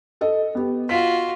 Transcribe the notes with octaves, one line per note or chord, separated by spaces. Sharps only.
A4 D#5
B3 G4
F4 F#4 B6